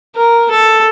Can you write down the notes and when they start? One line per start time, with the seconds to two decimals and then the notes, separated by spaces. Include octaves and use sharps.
0.16 A#4
0.51 A4